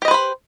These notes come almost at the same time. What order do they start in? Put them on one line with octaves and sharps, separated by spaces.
G4 D#5 B4 C5 B5